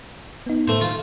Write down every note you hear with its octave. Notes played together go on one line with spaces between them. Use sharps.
B3 D#4
A2 A3 C5
D#3 F4